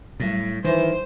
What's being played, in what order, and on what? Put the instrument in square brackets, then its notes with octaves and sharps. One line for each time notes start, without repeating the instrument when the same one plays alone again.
[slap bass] A2 [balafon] F#3 G3
[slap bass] D#3 [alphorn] E3 [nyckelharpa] C5